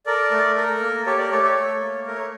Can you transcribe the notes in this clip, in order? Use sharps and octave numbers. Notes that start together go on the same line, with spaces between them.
A4 A#4 D5
A3
A4 A#4
A#3
G4 A4 C#5
A#4 D5
A3 A4 C#5
A4 C#5
A4
A#3
A3 A#4
C#5